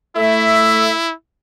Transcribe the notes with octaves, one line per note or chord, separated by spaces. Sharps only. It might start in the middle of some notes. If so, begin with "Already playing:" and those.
A3 E4 E5